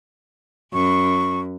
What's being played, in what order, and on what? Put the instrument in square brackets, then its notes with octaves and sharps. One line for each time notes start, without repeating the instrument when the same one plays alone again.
[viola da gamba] F#2 [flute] C#6